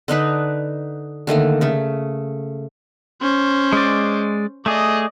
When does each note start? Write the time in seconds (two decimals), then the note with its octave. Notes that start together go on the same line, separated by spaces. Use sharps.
0.08 D3 D4 D#4 B4
1.27 D3 D#3 A3 A#3
1.61 C#3 A3
3.22 C#4 C5
3.73 G#3 D5
4.66 A3 G#4 D5 D#5